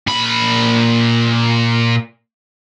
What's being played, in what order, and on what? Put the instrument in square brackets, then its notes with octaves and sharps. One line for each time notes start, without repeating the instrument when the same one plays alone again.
[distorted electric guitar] A#2 B5